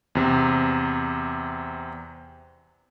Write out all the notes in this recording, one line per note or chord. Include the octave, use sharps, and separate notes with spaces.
E2 C3